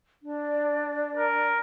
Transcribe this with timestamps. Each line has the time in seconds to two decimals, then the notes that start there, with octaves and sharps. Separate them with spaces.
0.24 D4 D5
1.15 A#4